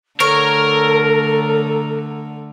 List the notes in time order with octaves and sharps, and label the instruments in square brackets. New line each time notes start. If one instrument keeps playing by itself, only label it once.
[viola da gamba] D3 A3 [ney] A4 [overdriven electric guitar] A#4 [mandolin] C#5